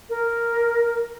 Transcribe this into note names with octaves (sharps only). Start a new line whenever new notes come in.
A#4